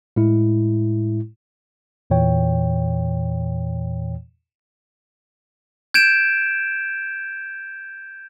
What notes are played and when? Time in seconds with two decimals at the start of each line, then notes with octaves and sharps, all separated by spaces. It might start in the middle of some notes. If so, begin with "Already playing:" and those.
0.16 A2 G#3 E4
2.10 E2 A#2 E3 C#5 G5
5.94 G6 G#6 D7 E7